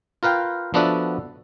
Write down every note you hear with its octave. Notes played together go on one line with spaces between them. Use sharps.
F4 A#4 B4 F5 G5
F3 B3 D4 F#4 A4 E5